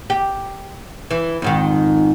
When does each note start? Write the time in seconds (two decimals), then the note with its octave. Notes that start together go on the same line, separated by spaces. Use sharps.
0.10 G4
1.11 E3
1.42 F2 G#2 D#3